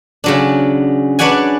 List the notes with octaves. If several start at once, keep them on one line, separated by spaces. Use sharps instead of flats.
C#3 F#3 D4
D4 B4 C#5 D5 F#5 G#5